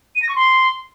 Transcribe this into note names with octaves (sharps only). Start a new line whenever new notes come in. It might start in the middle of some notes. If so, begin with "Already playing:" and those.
D#7
A#6
C#6
C6